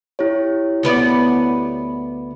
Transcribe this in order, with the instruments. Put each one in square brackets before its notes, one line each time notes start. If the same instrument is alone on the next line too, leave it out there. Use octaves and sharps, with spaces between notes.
[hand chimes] E4 G4 C#5
[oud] D2 B3 D5